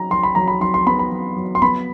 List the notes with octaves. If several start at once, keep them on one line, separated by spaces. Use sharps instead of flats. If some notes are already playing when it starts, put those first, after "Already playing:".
Already playing: F#3 D#4 A#5
F#3 C6
B5
F#3 A#5
B5
F#3 C6
C6
B3 B5
B5
F#3
F#3
C6
B3 B5